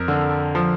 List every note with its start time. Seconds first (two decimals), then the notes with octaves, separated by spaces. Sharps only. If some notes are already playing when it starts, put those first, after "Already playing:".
Already playing: F2 A#4
0.08 D3
0.55 F3